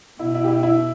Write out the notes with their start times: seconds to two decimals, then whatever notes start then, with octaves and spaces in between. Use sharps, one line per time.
0.19 B2 E4
0.34 E4
0.44 G4
0.48 E4
0.63 E4